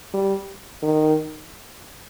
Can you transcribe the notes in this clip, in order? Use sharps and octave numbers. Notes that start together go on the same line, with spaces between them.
G3
D#3